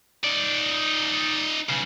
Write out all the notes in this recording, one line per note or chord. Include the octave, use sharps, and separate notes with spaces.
D#4 D5
B1 C#3